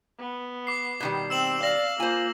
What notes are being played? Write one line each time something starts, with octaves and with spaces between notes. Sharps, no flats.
B3
D6 C7
B2 D#3 G3
C4 E6 E7 F#7
D5 F5 A#6 F#7
A#3 F4 C5 G#5